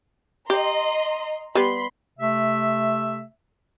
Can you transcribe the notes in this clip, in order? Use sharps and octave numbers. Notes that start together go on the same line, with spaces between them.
G4 D#5 A#5 C6
G3 B3 B5 C6
C3 A3 E5